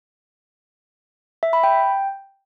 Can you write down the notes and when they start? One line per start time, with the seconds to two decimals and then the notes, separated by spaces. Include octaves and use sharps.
1.43 E5
1.53 B5
1.63 G5